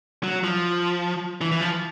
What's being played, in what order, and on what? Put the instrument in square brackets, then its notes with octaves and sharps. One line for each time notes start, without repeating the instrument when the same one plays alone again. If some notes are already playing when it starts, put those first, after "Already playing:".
[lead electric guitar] F#3
F3
E3
E3
F3